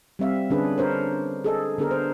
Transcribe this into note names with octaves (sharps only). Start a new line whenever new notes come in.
G3 C4 E5 F5
D3 C#4 D4 G#4 B4
D4 A#4 C5 C#5
G#4 A4 D#5
D3 B3 D4 G#4 A#4
C5